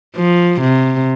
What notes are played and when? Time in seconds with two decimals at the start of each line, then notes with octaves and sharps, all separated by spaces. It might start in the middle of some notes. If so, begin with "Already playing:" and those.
0.16 F3
0.61 C3